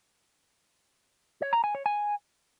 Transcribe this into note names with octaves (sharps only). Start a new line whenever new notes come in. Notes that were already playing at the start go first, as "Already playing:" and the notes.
C#5
A#5
G#5
C#5
G#5